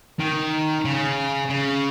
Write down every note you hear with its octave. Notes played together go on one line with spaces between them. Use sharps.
D#3
C#3
C#3